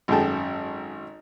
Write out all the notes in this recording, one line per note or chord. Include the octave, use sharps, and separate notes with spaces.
G#1 F#2 G#4 A4 G5 A5